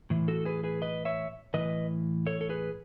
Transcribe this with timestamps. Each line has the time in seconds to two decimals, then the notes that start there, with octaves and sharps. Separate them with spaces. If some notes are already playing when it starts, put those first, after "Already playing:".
0.10 A2 E3
0.28 F#4 A4
0.45 G#4 B4
0.64 G#4 B4
0.82 B4 D#5
1.05 C#5 E5
1.54 A2 E3 B4 D#5
2.26 A4 C#5
2.41 A4
2.49 G#4 B4